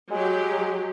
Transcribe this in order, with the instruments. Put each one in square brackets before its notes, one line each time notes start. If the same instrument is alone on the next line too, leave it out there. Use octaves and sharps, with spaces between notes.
[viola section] F#3 G4 [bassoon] G#3